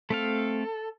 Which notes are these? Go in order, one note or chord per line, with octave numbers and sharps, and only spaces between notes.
A3 C4 A4 F5